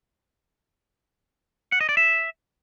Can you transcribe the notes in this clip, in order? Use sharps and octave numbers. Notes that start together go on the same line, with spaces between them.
F#5
D#5
D5
E5